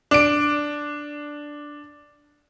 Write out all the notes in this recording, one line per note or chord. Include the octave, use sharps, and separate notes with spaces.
D4 D7